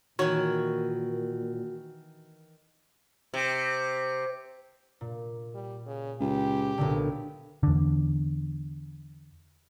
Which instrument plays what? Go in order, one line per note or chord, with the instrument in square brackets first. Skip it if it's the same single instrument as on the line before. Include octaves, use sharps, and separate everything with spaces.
[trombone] A#2 [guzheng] D#3 E3 [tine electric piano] F#4 [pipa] C#5
[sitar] C3
[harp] A#2
[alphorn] G3
C#3
[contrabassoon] C#2 [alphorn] G4
[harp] B1 A#2 D3
[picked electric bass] E2 D3